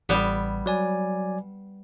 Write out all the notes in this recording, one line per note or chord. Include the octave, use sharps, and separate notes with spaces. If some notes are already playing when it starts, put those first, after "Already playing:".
A1 G3 B3
F#3 D5 G#5